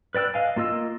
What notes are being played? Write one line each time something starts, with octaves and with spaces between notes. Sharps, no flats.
B4 D5 G5 E6 F#6
D#5 F5 G#5
A#3 F4 D#5 E6